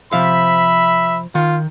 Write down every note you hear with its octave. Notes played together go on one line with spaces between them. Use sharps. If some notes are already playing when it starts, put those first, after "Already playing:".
C3 F3 E5 F5 B5
D#3 F4